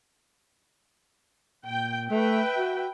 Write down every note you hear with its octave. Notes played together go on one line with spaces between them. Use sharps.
A#2 G5
A3 B4 E5 G5
F#4